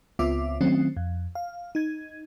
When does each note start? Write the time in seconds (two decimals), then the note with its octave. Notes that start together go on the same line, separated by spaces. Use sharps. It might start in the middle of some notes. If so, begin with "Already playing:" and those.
0.19 C#2 B3 C4 F4 E5 D6
0.61 D#3 F#3 A3 C4 C#4
0.97 F2
1.35 F5
1.75 D#4 G#6